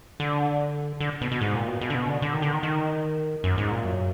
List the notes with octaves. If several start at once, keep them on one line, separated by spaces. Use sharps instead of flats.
D3
D3
B2
B2
G#2
A#2
B2
B2
D3
B2
D3
D3
D#3
D3
D#3
D#3
F#2
G#2
A#2
F#2